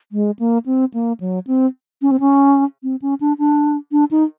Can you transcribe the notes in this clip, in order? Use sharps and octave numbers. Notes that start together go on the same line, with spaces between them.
G#3
A#3
C4
A#3
F#3
C4
C#4
C4
C#4
C4
C#4
D4
D4
D4
D#4